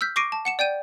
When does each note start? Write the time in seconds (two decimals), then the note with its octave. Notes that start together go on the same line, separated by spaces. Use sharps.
0.01 E6 F6 G6 B6
0.16 C#6 D6 A#6 C7 D7 D#7
0.32 A5
0.45 F#5 C#7 E7
0.59 D5 G5 G6 D#7